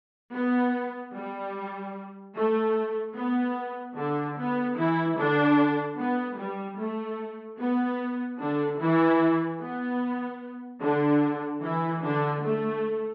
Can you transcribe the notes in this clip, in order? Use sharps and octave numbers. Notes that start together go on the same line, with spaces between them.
B3
G3
A3
B3
D3 D4
B3
E3 E4
D3 D4
B3
G3
A3
B3
D3 D4
E3 E4
B3
D3 D4
E3 E4
D3 D4
A3